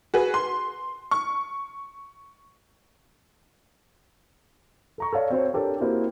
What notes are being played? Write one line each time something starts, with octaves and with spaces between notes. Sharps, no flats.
F#4 G#4 B4
C6
C#6
A4 A#5 C#6
A4 C#5 D5 F5
C4 F#4 C5 C#5
D4 G4 A4 A#4 C#5
A#3 C4 E4 F#4 G4 C5